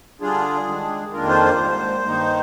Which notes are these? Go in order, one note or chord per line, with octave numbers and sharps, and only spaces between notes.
D3 G3 D4 F4 G#4
D#3 G#3 D4
F2 D#3 A#3 D4 F4 A#4
C5
C5
G#2 G3 A#3
G2 D#3 A#3 D#4